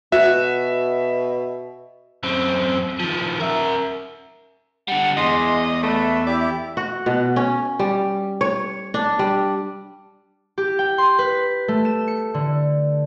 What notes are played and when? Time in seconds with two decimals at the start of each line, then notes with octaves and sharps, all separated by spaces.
0.12 B2 F#4 E5
2.23 F#2 C4
3.00 D#3 F3
3.40 A#4 E5
4.88 D3 G3 F#5
5.17 E2 G#3 D#5 C6
5.83 A3 B4 E5
6.27 E4 G4 D5
6.77 F#4
7.06 B2
7.36 C#4
7.79 G3
8.41 C#5
8.94 D4
9.19 G3
10.58 G4
10.79 G5
10.98 C6
11.18 B4
11.68 A3
11.85 E7
12.08 C#7
12.34 D3